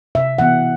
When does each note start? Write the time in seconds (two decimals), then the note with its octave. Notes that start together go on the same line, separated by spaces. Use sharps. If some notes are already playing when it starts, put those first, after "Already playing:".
0.15 C3 E5
0.38 E3 B3 F#5